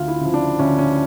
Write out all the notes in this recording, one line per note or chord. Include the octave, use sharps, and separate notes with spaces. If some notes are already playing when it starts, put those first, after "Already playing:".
Already playing: D2 F4
E4
C#3 F3
D4
D2 C#4
C#4